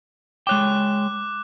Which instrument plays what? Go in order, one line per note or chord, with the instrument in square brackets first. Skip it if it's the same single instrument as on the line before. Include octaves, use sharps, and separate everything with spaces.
[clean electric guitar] G#3 C#5 G5 [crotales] D6 F#6